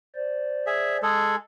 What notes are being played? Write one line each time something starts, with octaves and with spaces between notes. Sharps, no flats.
C5 D5
G#4 E5
G#3 G#4 A4